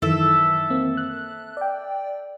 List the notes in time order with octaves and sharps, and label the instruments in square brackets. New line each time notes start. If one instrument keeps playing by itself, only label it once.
[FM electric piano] F#2 D#3 E3 [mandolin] A4 E5
[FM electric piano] A#3 C4
F#6
D5 G5